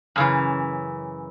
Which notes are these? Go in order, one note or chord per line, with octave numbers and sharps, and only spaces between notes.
F#2 C#3 E3